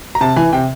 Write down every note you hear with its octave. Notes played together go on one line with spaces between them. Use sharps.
A#5
C3 A5
E3 G#5
C3 G5